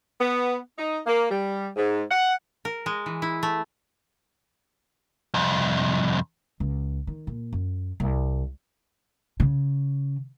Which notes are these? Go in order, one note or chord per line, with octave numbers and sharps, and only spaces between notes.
B3
D#4
A#3
G3
G#2
F#5
A#4
G#3
E3
E4
A3
C2 F2
C#2
D#3
A#2
F#2
C2
C#3